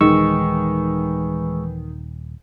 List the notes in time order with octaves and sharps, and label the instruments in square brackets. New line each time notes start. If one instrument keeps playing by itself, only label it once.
[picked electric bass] D#1 [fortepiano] D#3 [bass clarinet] E3 [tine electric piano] G#3 C#6 E6